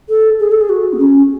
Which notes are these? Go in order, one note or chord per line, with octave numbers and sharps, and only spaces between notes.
A4
G#4
A4
G#4
F#4
B3
C#4